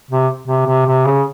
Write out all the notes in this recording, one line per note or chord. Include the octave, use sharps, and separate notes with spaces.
C3
C3
C3
C3
C#3